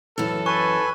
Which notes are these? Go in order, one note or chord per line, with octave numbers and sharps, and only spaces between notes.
F#2 E3 A4
B4 G#5 C#6